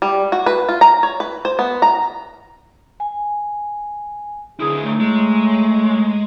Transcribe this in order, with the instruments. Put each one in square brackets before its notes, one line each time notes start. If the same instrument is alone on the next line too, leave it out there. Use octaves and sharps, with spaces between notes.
[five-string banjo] G3
F#4
B4
F4
A#5
C#5
B4
C5
B3
A#5
[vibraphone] G#5
[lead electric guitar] D3 E4 [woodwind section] G#4
[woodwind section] A2 F#3 A3
[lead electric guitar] G#3